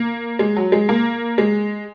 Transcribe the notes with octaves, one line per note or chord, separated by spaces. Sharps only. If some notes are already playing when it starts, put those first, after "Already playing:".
Already playing: A#3
G#3
F#3
G#3
A#3
G#3